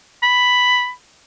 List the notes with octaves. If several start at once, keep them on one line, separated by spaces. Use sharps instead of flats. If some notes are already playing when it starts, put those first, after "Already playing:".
B5